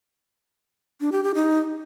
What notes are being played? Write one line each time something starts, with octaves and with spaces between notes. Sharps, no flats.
D4
G4
G4
D#4